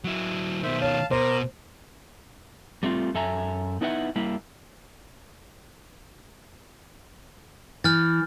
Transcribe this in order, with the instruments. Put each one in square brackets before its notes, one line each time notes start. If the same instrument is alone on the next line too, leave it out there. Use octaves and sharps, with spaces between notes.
[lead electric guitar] F#3 E4
[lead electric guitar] B2 D#3 [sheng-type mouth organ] C5 E5
[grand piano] C#5 [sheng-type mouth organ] F5 A5
[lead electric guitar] B2 [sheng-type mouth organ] A#4 D6 [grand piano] C5
[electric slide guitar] G3 A3 C4 D#4 F4
F#2 A4 E5 G#5 A#5
B3 D#4 E4 B4 E5 F#5
G3 A#3 E4
[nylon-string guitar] E3 [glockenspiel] F6 G6 A6